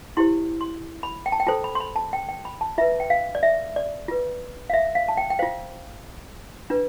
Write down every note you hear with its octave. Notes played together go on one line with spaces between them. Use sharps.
E4 G4 C5 C6
C6
B5
G5
A5
G5
F4 A4 C5 A5
B5
C6
B5
A5
G5
G5
B5
A5
F4 B4 E5
G5
F5
D5
E5
D5
F4 B4
F5
E5
F5
A5
G5
G5
F4 C5 F5
D4 F4 B4